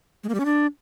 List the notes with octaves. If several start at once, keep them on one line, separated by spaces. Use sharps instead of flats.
G#3
A#3
G3
C#4
D4